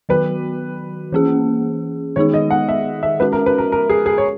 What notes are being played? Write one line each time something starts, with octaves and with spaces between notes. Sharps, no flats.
D#3 F#3 B3 F#4 B4
E3 A#3 C#4 G#4
D#3 G#3 B3 D#4 G#4 C#5
D#5
F#5
E5
E5
G#3 C#4 F#4 B4
A#4
B4
A#4
A#4
G#4
G#4
C#5